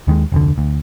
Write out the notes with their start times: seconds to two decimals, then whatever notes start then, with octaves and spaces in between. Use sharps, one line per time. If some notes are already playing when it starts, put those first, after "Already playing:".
0.07 D#2 D#3 G#3
0.32 F1 D2 D3
0.58 D2